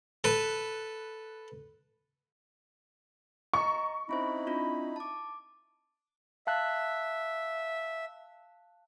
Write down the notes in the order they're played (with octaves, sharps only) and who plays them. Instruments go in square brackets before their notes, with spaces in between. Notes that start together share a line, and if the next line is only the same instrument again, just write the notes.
[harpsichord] A4 B4
[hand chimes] D#5 A#5 [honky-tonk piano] C#6
[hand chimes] C4 C#4 C5 [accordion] D#4 E4 B5
[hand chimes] C4 D4 F4
A5 D6
[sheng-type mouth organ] E5 [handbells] F5 A5 F#6